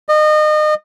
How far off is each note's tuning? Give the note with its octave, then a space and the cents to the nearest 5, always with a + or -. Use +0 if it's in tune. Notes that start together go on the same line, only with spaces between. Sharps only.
D#5 -30